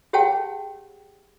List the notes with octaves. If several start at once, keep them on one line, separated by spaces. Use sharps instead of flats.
G4 G#4 C#5 F#5 G5 A5